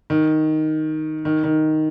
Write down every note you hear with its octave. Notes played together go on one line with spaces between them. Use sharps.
D#3
D#3
D#3